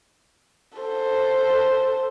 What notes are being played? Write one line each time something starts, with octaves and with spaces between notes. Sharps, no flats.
A4 C5